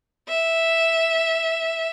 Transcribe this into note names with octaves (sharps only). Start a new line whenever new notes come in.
E5